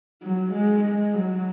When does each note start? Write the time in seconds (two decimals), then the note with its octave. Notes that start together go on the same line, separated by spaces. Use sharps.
0.22 F#3
0.52 G#3
0.83 G#3
1.14 F#3